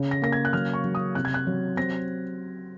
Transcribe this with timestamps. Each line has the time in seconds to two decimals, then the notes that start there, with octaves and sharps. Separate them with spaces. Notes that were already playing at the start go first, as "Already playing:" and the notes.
Already playing: C#3
0.11 A#6
0.22 A#3 A#6
0.32 G#6
0.45 F#6
0.53 F#3 F6
0.73 C#6
0.84 F#3
0.95 D#6
1.15 C3 F#6
1.25 G#6
1.34 F#6
1.47 F#3
1.77 C4 A#6